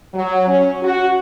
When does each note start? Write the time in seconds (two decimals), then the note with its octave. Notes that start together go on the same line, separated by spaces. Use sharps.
0.13 F#3
0.47 C#4
0.82 F#4